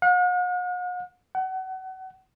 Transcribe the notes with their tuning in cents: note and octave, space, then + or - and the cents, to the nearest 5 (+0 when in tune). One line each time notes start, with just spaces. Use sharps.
F#5 -45
F#5 +30